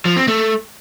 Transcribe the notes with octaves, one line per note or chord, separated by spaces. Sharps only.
F3
C4
A3